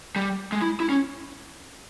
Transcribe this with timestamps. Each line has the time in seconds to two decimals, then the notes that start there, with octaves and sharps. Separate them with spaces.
0.16 G3
0.52 G#3
0.62 E4
0.80 E4
0.89 C#4